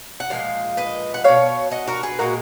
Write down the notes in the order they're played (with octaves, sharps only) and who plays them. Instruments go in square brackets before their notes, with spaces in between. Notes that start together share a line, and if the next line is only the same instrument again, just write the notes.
[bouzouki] F#5
A#2 F3 G#3 F5
B4 D#5
F#5
F#3 C#5 F5
B2
D#5 F#5
F#4 A#4
G#4 B4
A#2 G#3 F#4 A#4